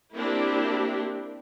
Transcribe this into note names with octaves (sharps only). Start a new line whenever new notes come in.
A#3 C4 D4 E4 G4